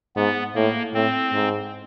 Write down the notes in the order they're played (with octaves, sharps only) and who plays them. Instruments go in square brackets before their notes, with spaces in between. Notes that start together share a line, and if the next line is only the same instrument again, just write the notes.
[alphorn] G#2 [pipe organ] B3
[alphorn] A2 [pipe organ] A#3
[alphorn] A2 [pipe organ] C4
[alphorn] G#2